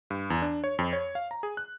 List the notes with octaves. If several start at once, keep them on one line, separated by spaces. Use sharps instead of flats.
G2
E2
D4
C#5
F2
C#5
F5
A#5
G#4
F#6